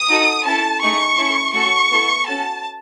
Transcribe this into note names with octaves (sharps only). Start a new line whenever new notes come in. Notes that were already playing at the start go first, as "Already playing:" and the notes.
Already playing: D#6
D#4 F#4 A4
C#4 E4 A4 A5
A3 D#4 G#4 C#6
C#4 E4 A4
A3 C#4 F#4 A4 C#6
B3 E4 A4
C#4 F#4 A4 A5